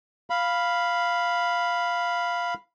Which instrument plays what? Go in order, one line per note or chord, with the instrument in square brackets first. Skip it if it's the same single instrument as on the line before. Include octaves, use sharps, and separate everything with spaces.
[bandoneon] F5 B5